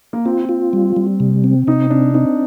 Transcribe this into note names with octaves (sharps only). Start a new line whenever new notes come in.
A#3
C4 F4
F4
G3
G3
C3
C4
C3 D#4
C4 D4
C4 D#4